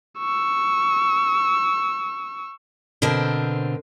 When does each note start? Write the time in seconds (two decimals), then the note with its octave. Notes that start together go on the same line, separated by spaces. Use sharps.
0.18 C#6 E6
3.02 B2 D3 C4 A#4 C5